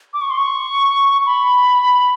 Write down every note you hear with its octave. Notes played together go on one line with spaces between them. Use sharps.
D6
C#6
C6
C#6
B5